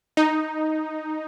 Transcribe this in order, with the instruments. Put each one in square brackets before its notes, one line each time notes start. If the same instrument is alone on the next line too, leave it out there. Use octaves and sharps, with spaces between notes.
[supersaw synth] D#4